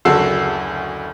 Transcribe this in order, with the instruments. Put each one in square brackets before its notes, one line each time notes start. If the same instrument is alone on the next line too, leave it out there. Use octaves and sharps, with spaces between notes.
[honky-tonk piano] F#1 D2 F#4 A4 E6 C7